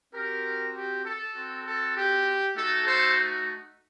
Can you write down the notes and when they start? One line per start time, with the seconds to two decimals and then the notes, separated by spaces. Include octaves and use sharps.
0.14 C4 F#4 G4 A#4
0.75 G4
1.05 A4
1.35 C4 F#4
1.65 A4
1.96 G4
2.56 A3 D#4 F#4 A4
2.86 A4 C5